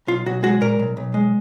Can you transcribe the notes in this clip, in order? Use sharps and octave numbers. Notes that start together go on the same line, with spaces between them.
B1 F4
B1 F#4
G#3 F#4
A#2 A#4
B1
B1
G#3